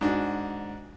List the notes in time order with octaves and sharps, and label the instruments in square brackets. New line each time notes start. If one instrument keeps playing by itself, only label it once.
[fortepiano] G#2 D4 F#4